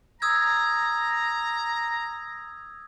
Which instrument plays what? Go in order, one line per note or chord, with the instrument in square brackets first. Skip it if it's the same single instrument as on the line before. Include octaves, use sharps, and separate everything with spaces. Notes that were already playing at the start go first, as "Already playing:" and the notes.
[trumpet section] A#5 [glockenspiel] D#6 E6 G#6